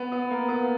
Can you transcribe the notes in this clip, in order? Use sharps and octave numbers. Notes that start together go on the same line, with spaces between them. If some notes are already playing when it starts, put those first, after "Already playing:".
Already playing: B3
B3
A#3
B3